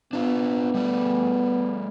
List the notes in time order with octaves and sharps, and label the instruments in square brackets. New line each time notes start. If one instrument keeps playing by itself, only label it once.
[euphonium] B3 [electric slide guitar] D4 F4
[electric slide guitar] G3 A3 D5